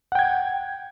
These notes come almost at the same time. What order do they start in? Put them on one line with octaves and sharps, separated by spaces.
F#5 G5 G#6